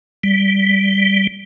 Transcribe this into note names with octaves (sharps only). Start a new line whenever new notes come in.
G3